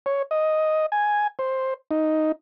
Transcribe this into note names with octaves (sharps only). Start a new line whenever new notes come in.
C#5
D#5
G#5
C5
D#4